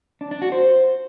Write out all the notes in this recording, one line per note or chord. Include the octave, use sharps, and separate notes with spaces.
D4
D4
F#4
C5